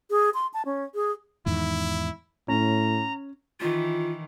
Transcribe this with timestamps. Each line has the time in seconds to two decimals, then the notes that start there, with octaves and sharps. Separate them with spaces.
0.11 G#4
0.34 C6
0.54 A5
0.66 C#4
0.95 G#4
1.46 E2 G#2 D#3 E4
2.48 A2 C#4 A#5
3.61 D#3 E3 F4